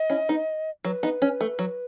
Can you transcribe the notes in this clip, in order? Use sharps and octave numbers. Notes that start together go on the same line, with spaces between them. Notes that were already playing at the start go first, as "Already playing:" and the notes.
Already playing: D#5
C#4 E4
B3 D#4
F#3 B4
B3 D#4
C#4
A3
F#3